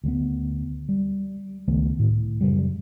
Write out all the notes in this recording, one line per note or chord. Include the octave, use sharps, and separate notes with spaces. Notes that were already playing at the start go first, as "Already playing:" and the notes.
D2 G3 B3
G3
C#2 D#3 A3 B3
A2
F#2 C#3 G3